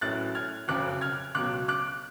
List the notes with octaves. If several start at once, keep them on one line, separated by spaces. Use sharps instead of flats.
A1 A2 F#3 F#6 A6
F6 G#6
F#1 F2 C#3 F#3 D6 F#6
F6 G#6
C#2 B2 F#3 D6 F#6
D6 F#6